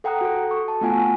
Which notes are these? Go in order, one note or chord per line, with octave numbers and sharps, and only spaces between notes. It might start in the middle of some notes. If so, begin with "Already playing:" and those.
A4 F#5 G5 A#5 D#6 F#6
F#4 A4
C#6
A5
A3 B3 F4 F#5 G#5